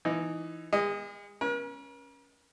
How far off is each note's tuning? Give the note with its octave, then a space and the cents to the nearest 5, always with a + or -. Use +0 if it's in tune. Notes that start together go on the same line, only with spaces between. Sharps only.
E3 +15 D#4 +0
G#3 -40 D#5 +0
C#4 +0 A#4 +45